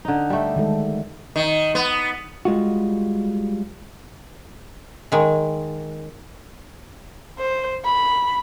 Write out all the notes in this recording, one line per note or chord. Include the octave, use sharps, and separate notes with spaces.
D3 D#4
G3 A3
D#3 G#3 A4
D#3
B3
G3 G#3 F4 F#4
D#3 G#3
C5
B5